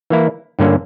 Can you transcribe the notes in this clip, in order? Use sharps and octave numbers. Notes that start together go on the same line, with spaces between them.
E3 A#3 E4
G2 D3 A#3 C#4